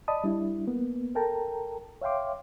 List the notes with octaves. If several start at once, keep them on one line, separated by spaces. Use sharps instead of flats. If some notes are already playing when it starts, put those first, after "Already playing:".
D5 D#5 A5 B5 D#6
G3 D4 E4
A#3 B3
A4 A#4 G5 A5 A#5
C#5 E5 F5 G5 C6 D6